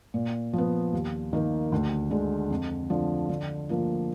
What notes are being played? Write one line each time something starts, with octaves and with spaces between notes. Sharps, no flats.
A#2
F3 B3
D#2
D#3 A#3
D2
D3 G#3
F2
D3 F3
D3
F3 A#3 F4